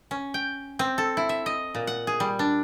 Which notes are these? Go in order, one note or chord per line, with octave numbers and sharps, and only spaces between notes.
C#4
G5
C4
A4
E4
E5
D#5
A#2
F#5
G#4
G3
D4